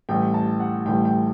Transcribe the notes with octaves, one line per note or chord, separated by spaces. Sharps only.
A1 A2 G3 G5
A5
F#5
A1 A2 G3 G5
G5